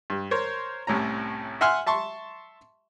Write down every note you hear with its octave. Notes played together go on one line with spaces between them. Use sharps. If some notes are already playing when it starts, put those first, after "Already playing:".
G2
A#4 C5 C#5
C2 A2 C#4 A#5
E5 F#5 G#5 C6 F6
E5 A5 C6 C#6